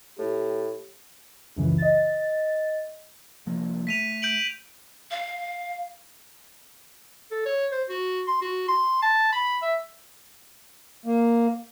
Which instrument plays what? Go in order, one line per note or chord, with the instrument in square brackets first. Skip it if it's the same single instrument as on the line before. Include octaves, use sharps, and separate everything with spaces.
[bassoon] A2 [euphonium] G4
[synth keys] C#2 F#2 C#3 E3
D#5 A6
[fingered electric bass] C2 F3 A#3
[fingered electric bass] A3 [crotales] B6 D#7 F7
[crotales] G6 D7 F#7
[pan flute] F5
[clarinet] A4
C#5
C5
F#4
C6
F#4
C6
A5
B5
E5
[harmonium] A#3